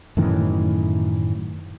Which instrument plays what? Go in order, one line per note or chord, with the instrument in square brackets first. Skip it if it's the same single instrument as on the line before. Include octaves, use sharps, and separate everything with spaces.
[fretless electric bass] F#2 A2 D#3 E3